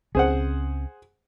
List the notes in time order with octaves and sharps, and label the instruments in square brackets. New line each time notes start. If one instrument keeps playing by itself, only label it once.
[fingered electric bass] C#2 C4 C#4 [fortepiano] G#4 C5 F#5